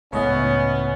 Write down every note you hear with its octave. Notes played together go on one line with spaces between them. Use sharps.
C#2 A2 B3 C#4 C#5 D#5 E5